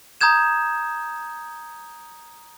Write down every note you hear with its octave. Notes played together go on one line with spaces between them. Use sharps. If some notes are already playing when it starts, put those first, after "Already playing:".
A#5 D#6 G6 G#6 E7